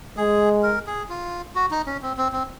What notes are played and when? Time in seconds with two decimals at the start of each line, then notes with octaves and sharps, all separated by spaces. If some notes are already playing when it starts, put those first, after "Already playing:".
0.17 G#3 G#4
0.63 A#4
0.87 G#4
1.09 F4
1.55 F#4
1.71 D#4
1.87 C#4
2.02 C4
2.17 C4
2.32 C4